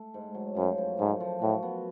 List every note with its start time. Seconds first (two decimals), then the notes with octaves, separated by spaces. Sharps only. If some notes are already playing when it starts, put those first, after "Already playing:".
Already playing: A3
0.14 G#2
0.35 F#3
0.56 F#2 F3
0.78 F#2
0.99 G#2 A3
1.20 F3
1.41 A2 F#4
1.63 B3